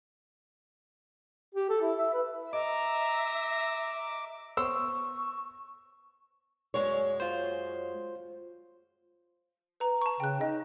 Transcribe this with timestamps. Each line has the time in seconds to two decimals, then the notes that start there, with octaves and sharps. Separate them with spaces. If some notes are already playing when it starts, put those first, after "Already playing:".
1.55 G4
1.69 A4
1.81 E4
1.98 E5
2.13 B4
2.53 D#5 E5 A#5 D6
4.57 B3 C5 C#5 C#6 E6
6.74 F#2 G#3 C#5
7.20 F4 C5
9.80 B4 A#5
10.02 A5 C#6
10.20 C#3 G5 F#6
10.41 D#4 D#5